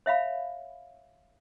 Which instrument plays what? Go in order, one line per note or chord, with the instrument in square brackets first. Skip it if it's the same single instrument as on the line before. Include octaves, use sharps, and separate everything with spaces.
[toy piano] C#5 E5 F5 B5